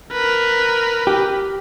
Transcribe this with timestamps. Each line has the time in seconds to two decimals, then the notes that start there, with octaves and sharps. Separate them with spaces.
0.13 A#4 B4
1.07 G4